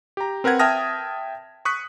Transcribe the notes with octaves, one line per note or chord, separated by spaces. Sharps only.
G4 A#5
C4 A#4 B4 F#5 G#6
E5 G5 A5 D#6 F6 A#6
C#6 D#6 F#6 B6